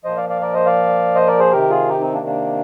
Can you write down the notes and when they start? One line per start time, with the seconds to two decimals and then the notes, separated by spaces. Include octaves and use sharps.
0.04 A#2 F3 C5 D#5
0.17 D5 F5
0.29 D5 F5
0.42 A#4 D5
0.54 C5 D#5
0.66 D5 F5
1.15 C5 D#5
1.27 A#4 D5
1.39 G#4 C5
1.52 C3 D#3 G4 A#4
1.70 F4 G#4
1.89 D#4 G4
2.01 C4 D#4
2.13 A#3 D4
2.26 A#3 D4